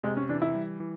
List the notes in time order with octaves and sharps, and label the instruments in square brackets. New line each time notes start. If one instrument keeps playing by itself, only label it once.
[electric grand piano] C3 [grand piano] G#3
[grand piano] C#4
[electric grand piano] E3 [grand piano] D4
[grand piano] E4
[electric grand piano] G3
E3